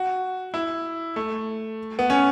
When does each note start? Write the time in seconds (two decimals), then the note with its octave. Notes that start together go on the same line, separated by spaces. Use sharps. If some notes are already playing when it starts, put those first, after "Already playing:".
Already playing: F#4
0.54 E4
1.16 A3
1.99 B3
2.10 C#4